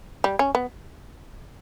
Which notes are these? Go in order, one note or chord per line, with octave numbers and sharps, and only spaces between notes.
G3
C#4
B3